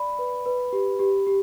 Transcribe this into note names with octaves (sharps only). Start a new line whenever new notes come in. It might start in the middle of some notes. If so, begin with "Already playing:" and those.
Already playing: D5 B5
B4
B4
G4
G4
G4